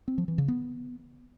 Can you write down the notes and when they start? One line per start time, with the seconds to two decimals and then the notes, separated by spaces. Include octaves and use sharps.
0.08 C4
0.18 F3
0.28 E3
0.38 C#3
0.48 B3